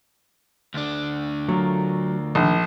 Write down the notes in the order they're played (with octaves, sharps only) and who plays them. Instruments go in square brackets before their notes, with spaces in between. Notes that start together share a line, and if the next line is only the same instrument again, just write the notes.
[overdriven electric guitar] D2 D4
[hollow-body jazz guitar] F#3 [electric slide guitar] A3 F4 A#4
[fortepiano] A#1 [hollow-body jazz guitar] D#3